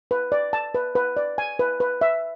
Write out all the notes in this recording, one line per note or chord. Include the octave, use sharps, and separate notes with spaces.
B4
D5
A5
B4
B4
D5
G#5
B4
B4
E5